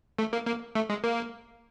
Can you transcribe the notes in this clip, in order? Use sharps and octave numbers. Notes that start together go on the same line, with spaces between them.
A3
A#3
A#3
A3
G#3
A#3